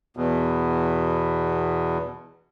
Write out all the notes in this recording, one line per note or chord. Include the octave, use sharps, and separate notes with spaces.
E2 B2